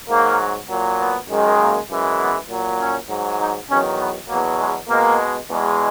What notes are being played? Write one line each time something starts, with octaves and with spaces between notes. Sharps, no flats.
G#2 F#3 A#3
A#2 F#3
B3
F#2 D#3 G#3
A#3
F#2 E3 G#3
B3
A#2 F#3
C#4
G#2 F#3
D#4
E2 D#3 F#3 C#4
B3
E2 B2 F#3 A#3
G#3
B2 G#3 A#3
E2 B2 G#3